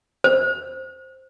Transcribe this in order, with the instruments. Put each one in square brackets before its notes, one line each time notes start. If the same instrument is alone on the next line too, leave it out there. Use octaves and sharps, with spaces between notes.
[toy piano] C5